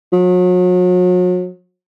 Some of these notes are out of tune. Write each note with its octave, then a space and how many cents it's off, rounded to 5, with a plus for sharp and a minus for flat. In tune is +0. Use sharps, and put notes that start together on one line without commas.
F#3 -40